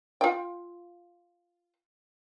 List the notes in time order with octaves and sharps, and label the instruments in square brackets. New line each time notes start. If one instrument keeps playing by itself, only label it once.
[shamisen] F4 G5